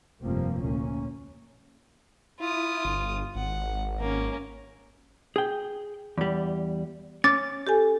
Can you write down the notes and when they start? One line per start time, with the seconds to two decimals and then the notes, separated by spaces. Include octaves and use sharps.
0.23 F1 G2 F3 A#3 C4
0.60 D2 A#2 A#3 C#4
2.40 E4 F4 D#6
2.85 G1
3.35 G#1 F#5
3.99 A#3 C#4
5.36 G#4 G5
6.18 E2 G3
7.24 C#4 D6 A6
7.67 G4 A4 G#5